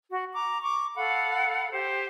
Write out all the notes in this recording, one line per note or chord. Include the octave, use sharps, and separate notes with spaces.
F#4 F#5
A#5 D6
C#6 D6
A4 F5 F#5 B5
G4 C5